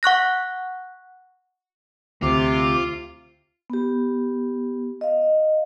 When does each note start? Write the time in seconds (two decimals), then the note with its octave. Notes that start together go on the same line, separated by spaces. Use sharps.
0.03 F#5 C#6 F#6 A#6
2.22 D2 C3 F4 D6
3.70 B3 G4
5.01 D#5 F5